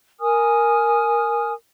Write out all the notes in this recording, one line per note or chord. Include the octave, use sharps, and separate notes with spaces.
A#4 G#5 D#6 F6